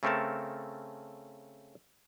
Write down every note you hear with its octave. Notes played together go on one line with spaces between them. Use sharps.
C#3 A3 C4 A4 A#4 A5